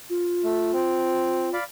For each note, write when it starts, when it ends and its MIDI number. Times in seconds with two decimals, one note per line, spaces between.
0.10 1.57 65
0.44 0.71 57
0.73 1.49 60
1.53 1.64 74
1.53 1.64 77
1.53 1.64 83